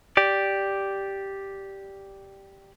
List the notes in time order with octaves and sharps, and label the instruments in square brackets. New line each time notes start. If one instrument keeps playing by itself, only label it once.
[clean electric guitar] G4 D5